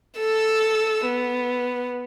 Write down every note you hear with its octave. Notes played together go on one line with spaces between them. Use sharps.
A4 E6
B3